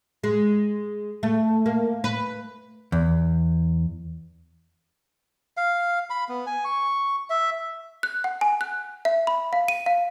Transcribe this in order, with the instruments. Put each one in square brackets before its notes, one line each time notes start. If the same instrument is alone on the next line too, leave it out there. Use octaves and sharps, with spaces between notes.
[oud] G#3
A3
A#3
B4
[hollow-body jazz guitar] E2
[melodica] F5
B5
B3
G#5
C#6
E5
[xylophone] F#6
F#5
G#5
F#6
E5
B5
F5
D#7
F5